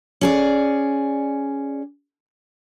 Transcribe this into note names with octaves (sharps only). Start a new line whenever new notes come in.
C#4 G#4 D5